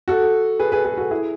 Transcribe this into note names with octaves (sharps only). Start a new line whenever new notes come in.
F#4 A4
G#4 B4
G#4 B4
G#4 B4
F#4 A4
E4 G#4